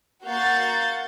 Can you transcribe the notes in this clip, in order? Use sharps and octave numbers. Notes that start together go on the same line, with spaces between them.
A#3 F#4 F5 F#5 G6 A6